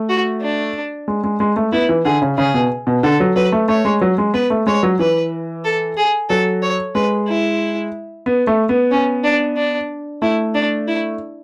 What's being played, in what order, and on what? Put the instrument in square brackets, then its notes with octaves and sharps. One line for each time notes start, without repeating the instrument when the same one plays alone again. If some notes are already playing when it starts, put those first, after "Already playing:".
Already playing: [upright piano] A3
[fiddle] F#4
D4
[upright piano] G#3
G#3
G#3
A3
[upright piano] B3 [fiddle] E4
[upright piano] E3
[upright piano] D3 [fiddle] G#4
[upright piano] C#3
[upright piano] C#3 [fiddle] G#4
[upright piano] B2
B2
[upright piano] D3 [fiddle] A4
[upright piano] F#3
[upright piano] F#3 [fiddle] B4
[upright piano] A3
[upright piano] A3 [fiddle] C#5
[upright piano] G#3
F#3
G#3
[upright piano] B3 [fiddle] B4
[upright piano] A3
[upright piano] G#3 [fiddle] C#5
[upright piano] F#3
[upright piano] E3 [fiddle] B4
[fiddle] A4
G#4
[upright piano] F#3 [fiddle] A4
[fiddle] C#5
[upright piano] G#3 [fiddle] B4
[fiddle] E4
[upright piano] B3
A3
B3
[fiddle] C#4
D4
D4
[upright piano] A3 [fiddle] E4
[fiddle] D4
E4